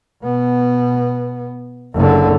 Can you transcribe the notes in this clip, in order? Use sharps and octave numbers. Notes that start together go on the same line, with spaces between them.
B2 B3
F#1 D3